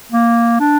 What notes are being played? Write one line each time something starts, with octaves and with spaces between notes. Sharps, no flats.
A#3
D4